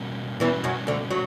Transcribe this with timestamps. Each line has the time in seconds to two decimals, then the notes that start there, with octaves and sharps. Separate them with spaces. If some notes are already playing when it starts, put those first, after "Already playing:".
Already playing: B2 G3 A#3 C#4 F#4
0.40 E2 B2 E3 G3 A#3 C#4 F#4
0.64 F#2 F#3
0.87 D2 D3
1.11 F#3